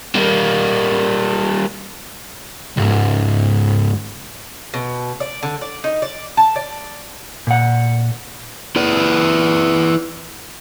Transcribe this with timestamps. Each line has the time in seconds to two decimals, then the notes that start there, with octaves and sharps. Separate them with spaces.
0.15 G3 A#3
2.77 C#2 G#2
4.74 B2
5.20 D5
5.43 D3
5.61 D5
5.84 D#4
6.02 D5
6.37 A5
6.56 D5
7.47 A#2 F#5
8.76 E4 B4 D5